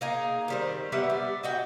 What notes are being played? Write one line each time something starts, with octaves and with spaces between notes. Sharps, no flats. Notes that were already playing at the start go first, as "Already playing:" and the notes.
A#3 D#4 G#4
D#3 G3 C4
G3 B3 E5 F#5
D4
D#4 F#4 G5